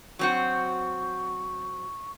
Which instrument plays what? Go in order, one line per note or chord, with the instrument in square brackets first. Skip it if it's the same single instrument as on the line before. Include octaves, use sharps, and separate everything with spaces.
[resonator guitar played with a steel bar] F#3 C4 F#4 [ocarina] C#6